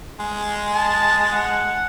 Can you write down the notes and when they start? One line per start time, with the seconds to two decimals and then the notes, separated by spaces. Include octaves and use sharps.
0.19 G#3
0.74 A5
1.33 F#5